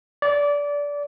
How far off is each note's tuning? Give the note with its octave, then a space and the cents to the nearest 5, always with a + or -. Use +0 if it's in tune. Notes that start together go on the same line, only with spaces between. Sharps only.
D5 -20